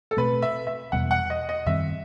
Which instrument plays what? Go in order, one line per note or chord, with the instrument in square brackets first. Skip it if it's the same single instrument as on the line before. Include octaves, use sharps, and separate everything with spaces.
[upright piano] A4
[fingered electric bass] B2 A3 C4 [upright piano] B4
[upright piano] E5
E5
[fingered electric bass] E2 B2 G3 B3 [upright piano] F#5
[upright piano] F#5
D#5
D#5
[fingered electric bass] F#2 D#3 G3 C4 [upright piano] E5